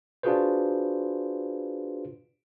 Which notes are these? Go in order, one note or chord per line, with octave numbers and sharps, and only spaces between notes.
D4 F4 F#4 G#4 B4 C5